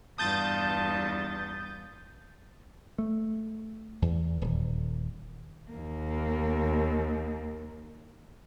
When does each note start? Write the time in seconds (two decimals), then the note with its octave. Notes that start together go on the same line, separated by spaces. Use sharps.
0.18 E2 G2 F4 A5 D#6 G6 A6
2.98 A3
4.02 E2
4.42 D#1
5.71 D#2 A#3